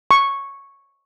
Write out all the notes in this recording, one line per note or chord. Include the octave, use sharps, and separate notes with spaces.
C#6